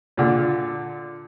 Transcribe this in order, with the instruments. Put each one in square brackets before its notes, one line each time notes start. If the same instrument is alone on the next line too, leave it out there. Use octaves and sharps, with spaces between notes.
[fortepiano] A#2 D3 F4